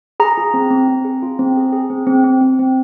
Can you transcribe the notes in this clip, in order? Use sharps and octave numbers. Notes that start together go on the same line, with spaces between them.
G#4 A#5
F4
C4
C4
C4
G#4
F4
C4
G#4
G#4
C4
C4
C4
C4
C4